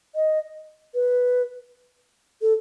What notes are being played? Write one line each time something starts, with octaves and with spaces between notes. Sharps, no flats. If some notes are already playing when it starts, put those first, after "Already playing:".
D#5
B4
A4